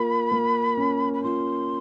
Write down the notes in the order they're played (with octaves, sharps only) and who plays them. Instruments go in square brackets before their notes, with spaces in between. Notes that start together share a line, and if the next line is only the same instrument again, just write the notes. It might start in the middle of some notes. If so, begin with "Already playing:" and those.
Already playing: [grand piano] A#3 F4 [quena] B5
[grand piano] A#3
C#4
[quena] B5
[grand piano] F4 [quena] C6